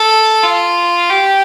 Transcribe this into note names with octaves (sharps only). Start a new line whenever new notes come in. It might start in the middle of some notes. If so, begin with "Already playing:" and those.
Already playing: A4
F4
G4